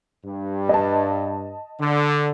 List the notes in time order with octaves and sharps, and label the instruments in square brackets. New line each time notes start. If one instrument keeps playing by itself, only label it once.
[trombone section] G2
[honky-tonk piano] D#5 A5
[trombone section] D3